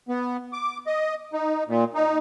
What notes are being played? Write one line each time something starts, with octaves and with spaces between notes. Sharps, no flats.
B3
D6
D#5
D#4
A#2
D#4